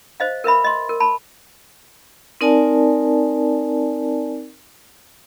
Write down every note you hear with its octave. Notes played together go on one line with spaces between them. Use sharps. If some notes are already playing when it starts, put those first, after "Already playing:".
C5 D#5 F5
A#4 B4 E5 B5
D#5 C6
A#4
A5 B5
C4 D#4 A#4 D5 G#5 A5